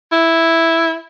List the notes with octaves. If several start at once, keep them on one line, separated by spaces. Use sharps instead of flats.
E4